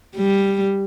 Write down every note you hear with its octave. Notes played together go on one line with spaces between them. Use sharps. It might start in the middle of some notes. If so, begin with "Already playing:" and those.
G3